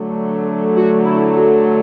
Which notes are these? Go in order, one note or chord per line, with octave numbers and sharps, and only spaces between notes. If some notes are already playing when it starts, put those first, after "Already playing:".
Already playing: D3 F#3 A3
F#4
E4
F#4